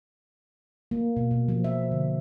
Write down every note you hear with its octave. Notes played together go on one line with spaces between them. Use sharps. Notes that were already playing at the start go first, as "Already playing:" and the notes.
A#3
B2
B2
F3
E5
D3